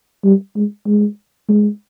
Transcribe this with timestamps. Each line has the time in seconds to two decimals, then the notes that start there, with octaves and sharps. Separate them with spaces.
0.24 G3
0.56 G#3
0.86 G#3
1.48 G#3